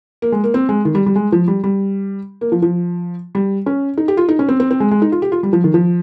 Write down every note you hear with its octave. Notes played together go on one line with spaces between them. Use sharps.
A#3
G#3
A#3
C4
G#3
D#3
G3
G3
G#3
F3
G3
G3
A#3
F3
F3
G3
C#4
D#4
G4
F4
D#4
C#4
C4
C4
C4
G#3
G#3
D#4
F4
G4
F4
G3
F3
D#3
F3